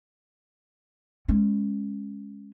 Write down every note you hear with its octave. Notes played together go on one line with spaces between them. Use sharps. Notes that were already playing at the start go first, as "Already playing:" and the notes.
G#3 C#4